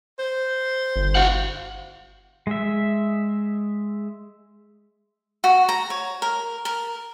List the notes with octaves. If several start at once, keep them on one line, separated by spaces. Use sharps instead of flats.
C5
G1
F#4 F5 F#5
G#3 E5
F#4
A#5
C#5
A#4
A#4